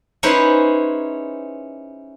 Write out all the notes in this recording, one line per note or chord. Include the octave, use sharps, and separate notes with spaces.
C#4 D#4 E4 G#4 B4 C5